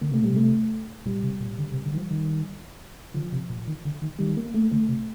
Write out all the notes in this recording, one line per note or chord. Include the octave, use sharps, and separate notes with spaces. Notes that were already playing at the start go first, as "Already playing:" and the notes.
D3 A#3
C3 A3
A#2
C3 G3
A3
A#2 G3
C3
A#2
D3
C3
D3
D#3
F3
D#3
D3 F3
C3
A#2
D#3
D3
D#3
D#3 G3
A#3
A3
D3 A3
C3